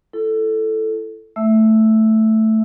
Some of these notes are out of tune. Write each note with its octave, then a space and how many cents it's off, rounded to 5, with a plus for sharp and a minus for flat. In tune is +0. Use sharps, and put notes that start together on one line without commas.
E4 +30 A4 +0
A3 +0 E5 +0 E6 +0